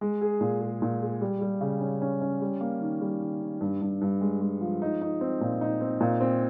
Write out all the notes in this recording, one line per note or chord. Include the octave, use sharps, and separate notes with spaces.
G#3
G#4
A#2
G#4
A#2
G#4
G3
G3
C#3
C#4
C#4
C#4
G3
A#3
D#3
G3
D#3
D#3
G2
G2
G2
G#3
G#3
F3
D#4
D#4
C4
A#2
D#4
C4
A#2
C4